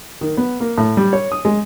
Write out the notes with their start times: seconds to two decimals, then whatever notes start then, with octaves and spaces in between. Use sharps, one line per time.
0.21 D#3
0.37 B3
0.60 A#3
0.78 A2
0.97 G3
1.13 C#5
1.32 D#6
1.45 G#3